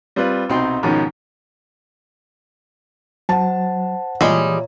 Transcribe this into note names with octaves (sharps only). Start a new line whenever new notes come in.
G3 C4 F4 B4
C2 B2 C4 D#4 G5 C6
G#2 B2 D#3 F3 C#4
F#3 C5 F#5 A5
A#2 E3 G3 G#3 C#5 E5 A#5 D#6